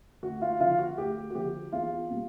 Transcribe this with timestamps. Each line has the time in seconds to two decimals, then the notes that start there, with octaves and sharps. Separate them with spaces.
0.23 D2 F#4
0.41 F4
0.60 D3 F3 F4
0.79 F#4
0.98 D2 G4
1.30 F#4
1.35 D3 F3 G4
1.72 E2 F4
2.10 B2 G3